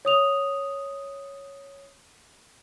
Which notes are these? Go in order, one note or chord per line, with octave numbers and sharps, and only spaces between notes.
C#5 D#6 F7